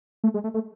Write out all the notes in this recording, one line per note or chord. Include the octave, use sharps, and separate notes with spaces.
A3
G#3
A3
A3